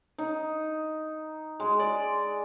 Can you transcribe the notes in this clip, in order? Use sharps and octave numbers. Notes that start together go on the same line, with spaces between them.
D#4
G#3
D5